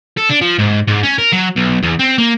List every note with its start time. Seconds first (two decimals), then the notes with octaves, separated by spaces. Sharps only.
0.17 A4
0.29 D4
0.41 F3
0.59 G#2
0.87 G#2
1.03 C#4
1.18 A#4
1.33 F#3
1.57 B1
1.83 E2
1.99 C4
2.18 A#3